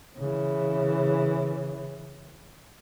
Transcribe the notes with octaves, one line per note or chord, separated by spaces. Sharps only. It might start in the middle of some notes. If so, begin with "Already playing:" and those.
C#3 E3